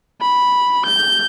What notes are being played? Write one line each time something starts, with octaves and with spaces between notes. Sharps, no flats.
B5
G6